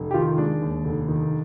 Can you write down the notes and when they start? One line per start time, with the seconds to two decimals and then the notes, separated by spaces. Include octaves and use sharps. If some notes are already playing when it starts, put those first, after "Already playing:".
Already playing: F1
0.11 G4
0.14 D#3 F4
0.38 G#3 D4
0.61 D#2
0.84 F1
1.08 D#3